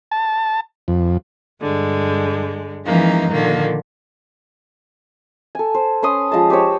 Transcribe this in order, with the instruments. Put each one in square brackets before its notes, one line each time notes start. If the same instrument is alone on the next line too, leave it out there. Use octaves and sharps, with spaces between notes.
[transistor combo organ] A5
F2
[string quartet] G2 D3 G#3
E3 F3 G#3 A#3 C#4 D#4
A#2 D3 D#3 F3 A#3
[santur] A4 G#5
C5
C#4 B4 C6 D#6
F3 G#3 D#5 A5
G4 C5 C#5